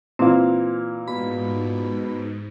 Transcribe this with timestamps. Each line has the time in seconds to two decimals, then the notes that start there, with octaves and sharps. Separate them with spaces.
0.19 A#2 E3 C4 F5
1.08 G#2 B2 B5